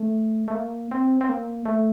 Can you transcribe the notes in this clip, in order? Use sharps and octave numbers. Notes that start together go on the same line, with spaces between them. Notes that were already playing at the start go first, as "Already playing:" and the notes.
Already playing: A3
A3
A#3
C4
C4
A#3
A3